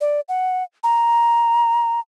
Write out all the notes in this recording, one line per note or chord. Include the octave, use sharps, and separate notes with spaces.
D5
F#5
A#5